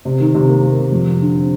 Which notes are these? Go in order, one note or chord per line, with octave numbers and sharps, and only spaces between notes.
C3
D#3
C3
A#3
A#3
C3
F2
F3
D3
C4